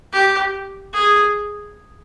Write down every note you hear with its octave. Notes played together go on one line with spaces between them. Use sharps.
G4
G#4